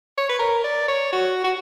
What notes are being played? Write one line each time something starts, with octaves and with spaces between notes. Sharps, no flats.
C#5
B4
A#4
D5
C#5
F#4
F#4